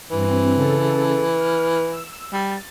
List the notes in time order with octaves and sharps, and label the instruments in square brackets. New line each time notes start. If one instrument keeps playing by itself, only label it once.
[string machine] G2 C4 [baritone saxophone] E3
[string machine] C#3 A4
F6
E6
[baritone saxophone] G3 [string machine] A6